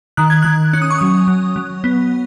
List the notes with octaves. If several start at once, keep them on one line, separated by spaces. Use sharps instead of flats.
D#3 F#6
G#6
D#3 F#6
C#4 F#6
D#6
C#6
F#3 D#6
F#3
F#3
B3